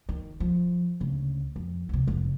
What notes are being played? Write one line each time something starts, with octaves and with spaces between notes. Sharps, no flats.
D#3
F3
D2 C#3
F2
E2 C3
F1 F2